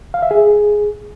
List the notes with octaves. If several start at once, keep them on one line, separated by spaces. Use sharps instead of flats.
F5
E5
G#4